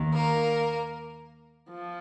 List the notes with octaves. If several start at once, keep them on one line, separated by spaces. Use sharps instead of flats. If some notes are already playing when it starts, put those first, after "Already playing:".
Already playing: D#2 D#3
A#3 A#4
F3